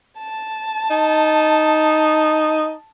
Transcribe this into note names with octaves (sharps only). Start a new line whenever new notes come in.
A5
D#4